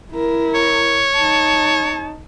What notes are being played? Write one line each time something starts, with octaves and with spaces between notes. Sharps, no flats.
E4 A#4
C#5
D#4 A5